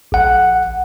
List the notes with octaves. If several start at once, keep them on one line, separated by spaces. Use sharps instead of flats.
A#1 F#5